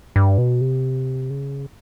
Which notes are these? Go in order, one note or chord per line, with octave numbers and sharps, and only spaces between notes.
G2
B2
C3
C#3